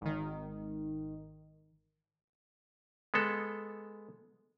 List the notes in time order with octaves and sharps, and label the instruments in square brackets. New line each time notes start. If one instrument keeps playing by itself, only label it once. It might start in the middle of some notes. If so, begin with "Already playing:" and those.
[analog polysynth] G#1 D#3
[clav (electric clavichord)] G#3 B3 A4